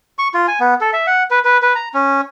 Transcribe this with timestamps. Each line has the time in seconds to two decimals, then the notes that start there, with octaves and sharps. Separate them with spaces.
0.18 C#6
0.34 F4
0.48 G#5
0.60 B3
0.81 A4
0.93 E5
1.07 F#5
1.31 B4
1.45 B4
1.62 B4
1.75 A#5
1.94 C#4